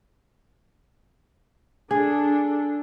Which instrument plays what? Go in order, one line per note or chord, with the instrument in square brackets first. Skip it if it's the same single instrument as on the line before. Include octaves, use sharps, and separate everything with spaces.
[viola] D4 A4 [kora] G#4